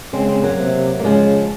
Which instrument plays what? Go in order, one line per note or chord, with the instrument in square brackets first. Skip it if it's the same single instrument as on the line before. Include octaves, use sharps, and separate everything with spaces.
[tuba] C#3 [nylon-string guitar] G#3 C4
[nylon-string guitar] G#3 C4
F#3 A#3
[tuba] C3
[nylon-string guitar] A#3
[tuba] C#3 [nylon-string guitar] F3 G#3